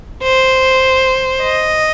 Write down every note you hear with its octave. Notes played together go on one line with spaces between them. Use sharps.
C5
D#5